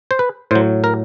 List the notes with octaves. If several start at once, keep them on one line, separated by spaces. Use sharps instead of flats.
C5
B4
A2 F#3 C5
A#4